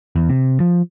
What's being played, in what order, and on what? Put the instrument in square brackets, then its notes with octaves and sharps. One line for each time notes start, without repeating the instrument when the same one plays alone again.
[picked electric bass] E2
C3
F3